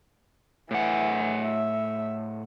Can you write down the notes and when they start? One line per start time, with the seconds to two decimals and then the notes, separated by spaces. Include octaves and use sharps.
0.71 A2 E3 F#5
1.44 E5